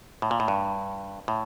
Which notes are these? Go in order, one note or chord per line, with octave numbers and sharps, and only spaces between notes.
A2
A#2
A2
G2
A2